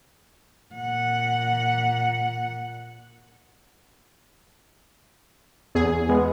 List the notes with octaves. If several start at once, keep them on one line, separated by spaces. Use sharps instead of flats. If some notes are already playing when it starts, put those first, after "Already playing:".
A#2 F#5
E2 G#4
G#3 B3